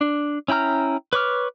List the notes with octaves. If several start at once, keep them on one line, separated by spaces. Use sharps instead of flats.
D4
C#4 E4 G5 A#5 F6
B4 C#5 D6 F6